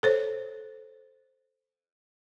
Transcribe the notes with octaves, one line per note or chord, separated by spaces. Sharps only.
A4 C5 C#5